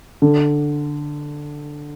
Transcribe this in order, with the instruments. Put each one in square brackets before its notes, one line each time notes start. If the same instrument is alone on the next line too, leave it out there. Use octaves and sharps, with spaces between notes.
[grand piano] D3